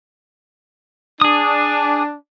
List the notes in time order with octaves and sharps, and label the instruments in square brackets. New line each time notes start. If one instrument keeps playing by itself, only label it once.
[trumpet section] D4 [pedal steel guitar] G#4 D#6